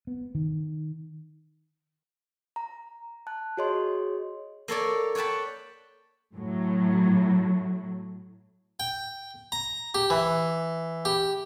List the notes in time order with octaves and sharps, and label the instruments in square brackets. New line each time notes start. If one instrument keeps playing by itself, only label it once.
[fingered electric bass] B3
D#3
[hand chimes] A#5
A5 F#6
F#4 G#4 C#5 D#5 C6
[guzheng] A#3 A4 C#5 D5
C#5 F#5 G5 A5 B5
[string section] A2 F#3
[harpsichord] G5
A#5
G4
E3
G4